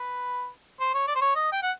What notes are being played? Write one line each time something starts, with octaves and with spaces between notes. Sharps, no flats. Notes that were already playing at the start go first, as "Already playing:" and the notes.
Already playing: B4
C5
C#5
D5
C5
C#5
D#5
G5
F#5